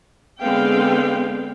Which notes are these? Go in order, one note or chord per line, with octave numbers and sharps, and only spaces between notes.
D3 G#3 B3 C4 F5 G5